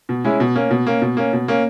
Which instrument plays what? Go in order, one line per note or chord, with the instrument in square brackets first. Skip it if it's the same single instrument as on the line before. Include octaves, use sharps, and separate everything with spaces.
[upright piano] B2
G#3 C#4 E4
B2
A#3 C#4
B2
A#3 C#4
B2
A#3 C#4
B2
A#3 C#4